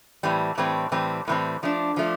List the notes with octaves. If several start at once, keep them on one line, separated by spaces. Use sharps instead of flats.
A2 E3 G3 C4
A2 E3 G3 C4
A2 E3 G3 C4
A2 E3 G3 C4
F3 A3 D4
F3 A3 D4